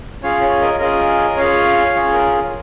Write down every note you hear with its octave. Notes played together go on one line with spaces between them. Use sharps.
C#4 F4 G#4 C#5 F5
C#5
A#4 D#5
C#4 F4 G#4 A#4 D#5
C#4 F4 G#4 C#5 F5
C#4 F4 G#4 C#5
A#4